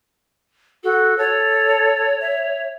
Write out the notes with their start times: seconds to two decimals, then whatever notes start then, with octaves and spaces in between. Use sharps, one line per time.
0.83 F#4 A4
1.18 A4 C#5
2.21 E5